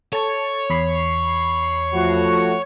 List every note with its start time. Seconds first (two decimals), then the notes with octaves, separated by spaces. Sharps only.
0.13 A4 C#5 A5
0.70 E2 B5 C7
1.95 F3 A3 F#4